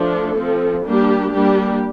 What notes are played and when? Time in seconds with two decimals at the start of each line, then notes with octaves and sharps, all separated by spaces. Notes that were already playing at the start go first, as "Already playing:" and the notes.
Already playing: F3 A3 D4 A4
0.37 F3 C4
0.85 G3 A#3 D4 G4
1.32 G3 A#3 D4 G4